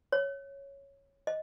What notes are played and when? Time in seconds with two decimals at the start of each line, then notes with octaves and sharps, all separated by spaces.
0.12 C#5
1.27 D#5